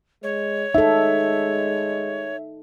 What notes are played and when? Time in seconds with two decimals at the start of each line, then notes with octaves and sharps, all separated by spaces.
0.23 G#3 C#5
0.75 G#3 D#4 A4 E5